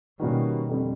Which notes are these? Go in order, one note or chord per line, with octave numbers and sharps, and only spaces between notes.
B2 D#3 G3 A#3 C#4 F#4
F2 D3 G3